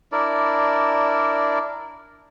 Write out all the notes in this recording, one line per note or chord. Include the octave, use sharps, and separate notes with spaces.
D4 E4 A#4 D5